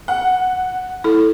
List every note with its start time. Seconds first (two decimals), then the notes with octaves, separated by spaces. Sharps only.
0.08 F#5
1.04 E4 A4